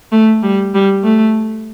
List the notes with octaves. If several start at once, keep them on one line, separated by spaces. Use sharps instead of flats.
A3
G3
G3
A3